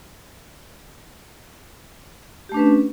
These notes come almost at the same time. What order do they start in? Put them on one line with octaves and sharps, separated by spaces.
G4 A3 D4 B4 C#4